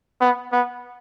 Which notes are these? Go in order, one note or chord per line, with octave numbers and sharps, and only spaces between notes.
B3
B3